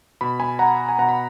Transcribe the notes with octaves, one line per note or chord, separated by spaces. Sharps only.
B2 B5
G#5 B5
F#5 A#5
G#5
B2 F#5 A#5
B5